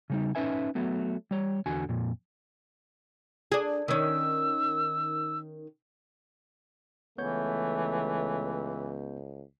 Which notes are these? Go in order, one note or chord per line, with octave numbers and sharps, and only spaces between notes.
C#3 G3 D#4
C#4 D#4 B4 E5 G#5
F#3 A3 B3
G3 C#5
E2 D3 F#4 G#5
F2 A#2
D4 G#4
D#3 C#4 E6
C#2 E3 A3 B3 C#5 G6